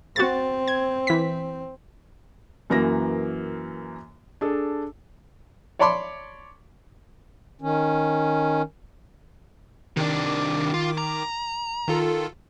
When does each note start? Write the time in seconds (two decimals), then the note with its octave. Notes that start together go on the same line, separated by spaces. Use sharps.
0.16 C4 F#4 A6
0.68 G#6
1.07 E3 B6
2.70 F#2 E3 A#3 B4 A#6
4.41 D4 G#4 A4
5.79 C#5 D5 A5 B5 C6 D6
7.61 D#3 C#4
9.97 C3 D#3 D4 D6
10.74 F4
10.98 A#5
11.88 D#3 F4 A4